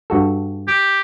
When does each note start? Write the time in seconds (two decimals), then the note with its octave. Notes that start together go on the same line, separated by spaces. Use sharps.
0.10 G2 F#4 A4
0.68 G4